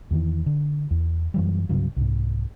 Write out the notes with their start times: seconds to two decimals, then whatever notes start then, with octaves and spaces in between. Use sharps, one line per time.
0.11 E2 D#3 E3
0.46 D3
0.91 E2
1.34 F#2 E3 G3
1.69 C2 G2 C#3 F#3
1.97 C2 G#2